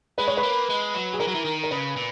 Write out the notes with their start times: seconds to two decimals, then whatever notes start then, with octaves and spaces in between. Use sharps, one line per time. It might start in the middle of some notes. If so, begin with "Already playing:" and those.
0.18 G#3 B4
0.28 C#5
0.37 B4
0.43 A#3
0.69 G#3
0.94 F#3
1.13 G#4
1.20 E3 A#4
1.28 F#3
1.35 E3
1.45 D#3
1.63 A#4
1.71 C#3 B4
1.96 A#2